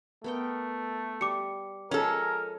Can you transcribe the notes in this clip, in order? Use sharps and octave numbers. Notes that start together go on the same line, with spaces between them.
A3 B3 A#4 G5
G3 D6 C#7
F3 G#3 C#4 A4 A#4